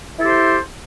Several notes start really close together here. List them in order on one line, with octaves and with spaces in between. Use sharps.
E4 A4 G4 C5